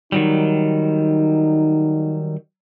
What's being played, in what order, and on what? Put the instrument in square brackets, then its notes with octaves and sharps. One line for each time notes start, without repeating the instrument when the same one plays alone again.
[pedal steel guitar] D#3 F#3 G3 [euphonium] D#4